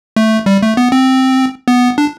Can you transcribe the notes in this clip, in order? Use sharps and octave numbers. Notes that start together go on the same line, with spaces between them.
A3
G3
A3
B3
C4
B3
D4